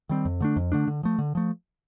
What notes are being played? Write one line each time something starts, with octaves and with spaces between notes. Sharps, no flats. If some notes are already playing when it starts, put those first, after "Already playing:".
D#3 G3 C4
F2
D3 A3 D4
F2
D3 A3 D4
D3
F3 A3
D3
F3 A3